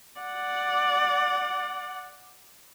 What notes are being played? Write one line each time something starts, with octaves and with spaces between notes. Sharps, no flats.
D5 F#5